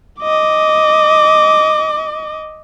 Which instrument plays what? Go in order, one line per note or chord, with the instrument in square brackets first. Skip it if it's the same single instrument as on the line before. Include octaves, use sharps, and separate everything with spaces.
[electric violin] D#5 D6